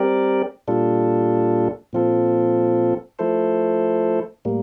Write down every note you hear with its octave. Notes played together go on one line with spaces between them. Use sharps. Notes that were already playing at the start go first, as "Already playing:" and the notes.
Already playing: G3 C4 G4 A#4 D5
A#2 G3 D4 F4 A4
A#2 F3 C4 F4 A4
F3 A3 E4 A4 C5
A2 G3 A#3